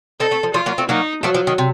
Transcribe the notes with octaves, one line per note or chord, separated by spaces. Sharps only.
C4 D#4 A4
A3 C4
F3
F3 A3 F4
F#3 A#3
A3 C4
F#3 A#3 D#4
F3 F#3 A3
F3
D#3
C3